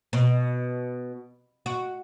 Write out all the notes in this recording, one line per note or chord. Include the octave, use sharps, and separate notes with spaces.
B2
F#4